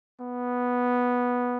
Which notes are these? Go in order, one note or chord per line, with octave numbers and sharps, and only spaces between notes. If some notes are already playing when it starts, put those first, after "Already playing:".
B3